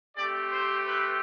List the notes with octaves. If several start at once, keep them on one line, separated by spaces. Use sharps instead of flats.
A3 C4 G4 D5
C5
B4